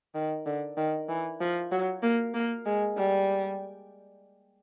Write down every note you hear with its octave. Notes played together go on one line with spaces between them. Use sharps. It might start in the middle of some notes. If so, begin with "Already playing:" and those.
D#3
D3
D#3
E3
F3
F#3
A#3
A#3
G#3
G3